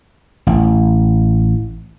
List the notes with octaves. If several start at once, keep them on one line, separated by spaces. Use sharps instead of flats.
A1